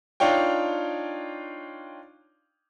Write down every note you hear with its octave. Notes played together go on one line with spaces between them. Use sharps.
D4 D#4 F4 C#5 G5